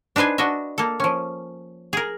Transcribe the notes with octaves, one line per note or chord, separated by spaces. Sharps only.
D4 D#4 B4 C5 G#5
D4 F#4 D#5 E5
A#3 A4
F3 C#4
G#4 A#4